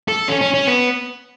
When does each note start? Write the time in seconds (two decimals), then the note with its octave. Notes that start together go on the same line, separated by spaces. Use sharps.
0.08 A4
0.28 C#4
0.41 C#4
0.54 C#4
0.67 B3